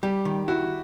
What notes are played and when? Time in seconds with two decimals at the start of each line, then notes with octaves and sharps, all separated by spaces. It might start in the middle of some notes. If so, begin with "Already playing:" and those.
0.03 G3 G4
0.25 D#3
0.48 E4 F#4